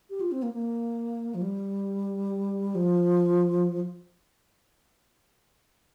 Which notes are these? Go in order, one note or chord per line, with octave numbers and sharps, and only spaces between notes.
G4
F4
C4
A#3
A#3
F3
G3
F3